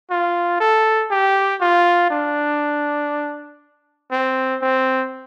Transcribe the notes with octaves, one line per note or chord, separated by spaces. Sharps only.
F4
A4
G4
F4
D4
C4
C4